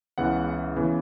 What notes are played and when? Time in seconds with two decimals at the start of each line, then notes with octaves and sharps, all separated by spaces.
0.18 C#2 C#3 E3 B3 F#5
0.76 C#3 E3 B3